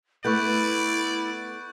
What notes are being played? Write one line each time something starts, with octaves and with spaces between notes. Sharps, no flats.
A3 B3 E4 D5 C#6 F#6 G6